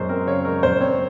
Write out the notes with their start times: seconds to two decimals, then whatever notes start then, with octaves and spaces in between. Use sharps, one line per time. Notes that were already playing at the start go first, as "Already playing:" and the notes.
Already playing: F#2 G#3 C5
0.09 C4 A#4
0.27 C#3 C#5
0.45 G#3 A#4
0.63 F#2 C5
0.81 C4 C#5